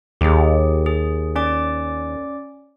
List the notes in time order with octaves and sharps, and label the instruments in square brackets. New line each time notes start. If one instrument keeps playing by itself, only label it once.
[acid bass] D#2 [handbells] G4 G#4
[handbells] G#4
C#4 D5 D6